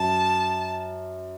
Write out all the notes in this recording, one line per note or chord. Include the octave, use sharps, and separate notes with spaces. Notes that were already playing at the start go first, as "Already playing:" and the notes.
Already playing: F#2 A5